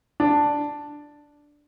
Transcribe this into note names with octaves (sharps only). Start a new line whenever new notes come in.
D4